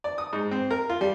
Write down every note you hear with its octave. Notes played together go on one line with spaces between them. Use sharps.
D5
D#6
G#2
C4
A#4
F4
G3